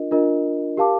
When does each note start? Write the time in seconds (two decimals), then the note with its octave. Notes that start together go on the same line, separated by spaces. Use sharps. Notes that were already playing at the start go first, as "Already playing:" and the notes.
Already playing: D4 F4 A#4 D#5
0.11 D4 F4 A#4 D#5
0.77 G4 A#4 F5 A5 D6